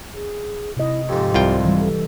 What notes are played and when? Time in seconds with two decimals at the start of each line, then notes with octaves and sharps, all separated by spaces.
0.14 G#4
0.77 C3 E4 D#5
1.09 F2 G#2 G4
1.34 C2 F4 G5
1.65 E3 G3
1.80 A4